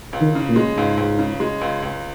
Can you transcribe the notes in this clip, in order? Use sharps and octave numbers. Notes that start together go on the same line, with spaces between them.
C#2
D#3
C#3
A#2
G#3
C#2 G#2
C#2
C#3
G#3
C#2
C#2